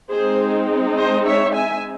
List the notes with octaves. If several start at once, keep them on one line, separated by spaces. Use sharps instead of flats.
G#3 C4 D#4 G#4 C5
C5 D#5
C#5 E5
E5 G#5